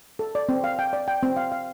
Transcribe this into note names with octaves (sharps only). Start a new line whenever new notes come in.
A4
D5
C4
F5
G5
D5
G5
C4
F5
F5